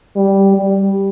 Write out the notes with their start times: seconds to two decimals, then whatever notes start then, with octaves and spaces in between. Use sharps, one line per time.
0.16 G3
0.56 G3